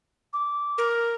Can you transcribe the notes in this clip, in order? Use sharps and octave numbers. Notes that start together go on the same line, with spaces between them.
D6
A#4